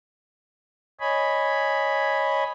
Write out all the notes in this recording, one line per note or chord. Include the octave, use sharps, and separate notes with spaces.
C#5 D#5 G#5 B5